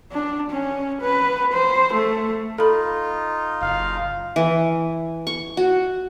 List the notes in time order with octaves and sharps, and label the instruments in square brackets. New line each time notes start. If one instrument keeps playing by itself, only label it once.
[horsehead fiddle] D4
C#4
B4
C5
A3
[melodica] D#4 F4 [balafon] A4 B5
[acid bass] F#1 [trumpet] F5
[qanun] E3
C#6
F#4